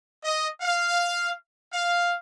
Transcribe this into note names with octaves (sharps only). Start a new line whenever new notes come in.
D#5
F5
F5